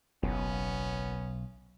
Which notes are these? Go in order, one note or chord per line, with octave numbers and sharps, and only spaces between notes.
F#1 B1 B3 C#4